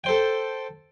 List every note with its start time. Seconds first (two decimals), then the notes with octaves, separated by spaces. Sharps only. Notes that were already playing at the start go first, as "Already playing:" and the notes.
0.04 A4 C5 G5